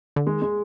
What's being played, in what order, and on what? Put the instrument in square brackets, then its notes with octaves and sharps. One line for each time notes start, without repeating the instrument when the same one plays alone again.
[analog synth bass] D3
[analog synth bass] D#3 [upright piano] G#3
[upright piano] G#3